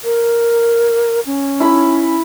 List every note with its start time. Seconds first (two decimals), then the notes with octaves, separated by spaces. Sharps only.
0.04 A#4
1.26 C#4
1.60 E4 B5